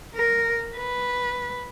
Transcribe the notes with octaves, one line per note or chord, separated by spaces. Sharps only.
A#4
B4